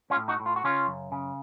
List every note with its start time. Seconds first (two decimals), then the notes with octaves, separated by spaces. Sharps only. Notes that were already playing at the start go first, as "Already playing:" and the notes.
0.10 C#4 F4
0.16 A2
0.28 D#4 F#4
0.40 A2
0.46 F4
0.56 F#4
0.64 C#3 C#4 F4
0.88 F#2
1.12 C#3